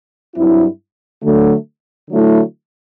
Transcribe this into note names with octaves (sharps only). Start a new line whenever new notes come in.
G2 F#3 C4 E4
D3 F#3 A3
D3 F#3 A3 E4